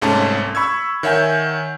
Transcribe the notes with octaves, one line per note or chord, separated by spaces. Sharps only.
C2 G#2 A3 C#4 A5
B5 C#6 E6 G#6
D#3 C#5 E5 F#5 G#5 G6